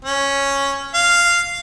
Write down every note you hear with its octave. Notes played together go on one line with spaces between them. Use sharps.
C#4
F5